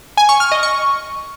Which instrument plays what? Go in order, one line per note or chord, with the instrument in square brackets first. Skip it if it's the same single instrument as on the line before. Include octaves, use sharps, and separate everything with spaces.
[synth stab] G#5
C#6
F6
D#5
C#6